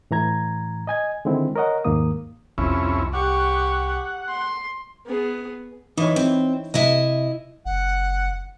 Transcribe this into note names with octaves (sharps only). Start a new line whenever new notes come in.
A2 E3 A#5 G#6
D#5 G#5 G#6
D3 D#3 G#3 C4 E4
A#4 C#5 D#5 F#5
D#2 G#2 D#3 A#3 D#6
C2 F2 C#4 E4
G4 F#5 C#6
C6
B3 G#4
E3 D#4 E4 C#5
C4
C3 E4 D#5 E5
F#1 F#5